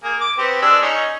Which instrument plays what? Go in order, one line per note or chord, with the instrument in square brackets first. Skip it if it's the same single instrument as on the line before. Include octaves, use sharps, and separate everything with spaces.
[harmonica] A#3 G#4
D6
B3 C4 G4
G#3 D4 E6
C#4 D#4 G#4